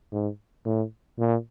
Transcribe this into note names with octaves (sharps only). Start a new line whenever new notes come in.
G#2
A2
A#2